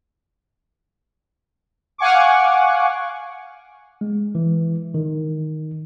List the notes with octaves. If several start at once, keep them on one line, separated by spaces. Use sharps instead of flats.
F5 F#5 G#5 C#6 D6
G#3
E3
D#3